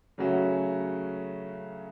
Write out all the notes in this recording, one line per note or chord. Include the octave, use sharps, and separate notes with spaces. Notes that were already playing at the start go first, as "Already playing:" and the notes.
C#3 F#3 A3 C#4 F#4